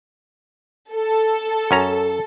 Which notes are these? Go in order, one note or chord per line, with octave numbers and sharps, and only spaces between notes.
A4
F#2 C#4 A#5